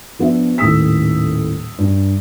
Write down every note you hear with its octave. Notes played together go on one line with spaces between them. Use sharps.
F3 B3 D4 E5
D#1 A2 D#3 D#6 E6 B6
G2